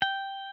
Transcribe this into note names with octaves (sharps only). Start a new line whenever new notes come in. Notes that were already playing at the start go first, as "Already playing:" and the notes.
G5